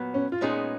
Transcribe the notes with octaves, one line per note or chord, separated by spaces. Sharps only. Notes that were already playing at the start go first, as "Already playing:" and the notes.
Already playing: A#2 F#3 B3
C#4
F4
A#2 G#3 B3 C#4 D#4 G#4